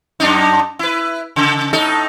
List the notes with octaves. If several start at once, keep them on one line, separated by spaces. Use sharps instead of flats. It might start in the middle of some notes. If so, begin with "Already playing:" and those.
F#2 D4 D#4
E4 B4
C#3
A2 D#4 A4